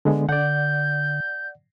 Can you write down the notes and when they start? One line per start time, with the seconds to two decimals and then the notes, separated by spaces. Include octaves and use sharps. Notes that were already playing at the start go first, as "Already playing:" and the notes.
0.05 D3 G#3 B3
0.29 D3 D5 F#5 G6